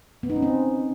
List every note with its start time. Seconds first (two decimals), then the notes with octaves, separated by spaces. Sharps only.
0.23 B3
0.30 D#4
0.36 C#4
0.43 C4